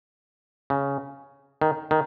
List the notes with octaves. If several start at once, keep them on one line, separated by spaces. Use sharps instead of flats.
C#3
D#3
D#3